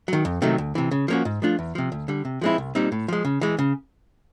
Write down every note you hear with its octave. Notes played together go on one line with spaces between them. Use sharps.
D#3 F#3
F2
C3 D#3 F#3 A3
D2
C3 E3
C#3
F3 A#3 C#4 F#4
G#2
F3 A3 D4 F4
E2
C3 F3
D2
D3 G3
C3
F3 G#3 C4 E4
C2
A#2 G3 C4 D#4
A2
F3 G#3
C#3
E3 G#3
C#3